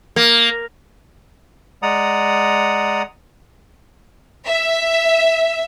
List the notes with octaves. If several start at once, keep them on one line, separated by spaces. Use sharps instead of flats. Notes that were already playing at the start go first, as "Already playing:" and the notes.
A#3
G#3 D5 F#5 A#5 D#6
E5